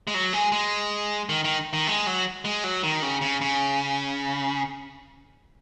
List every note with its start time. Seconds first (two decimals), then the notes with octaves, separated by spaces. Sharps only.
0.07 G#3
0.14 F#3
0.33 G#3
0.52 G#3
1.29 D#3
1.44 D#3
1.73 D#3
1.87 G#3
2.07 F#3
2.45 G#3
2.64 F#3
2.83 D#3
3.02 C#3
3.21 C#3
3.41 C#3